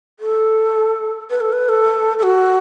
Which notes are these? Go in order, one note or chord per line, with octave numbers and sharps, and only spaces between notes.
A4
B4
A4
B4
A4
A4
F#4